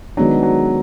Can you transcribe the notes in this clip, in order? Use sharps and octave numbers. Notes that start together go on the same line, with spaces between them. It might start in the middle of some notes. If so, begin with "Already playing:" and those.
D#3 F#3 G#3 B3 D4
F#3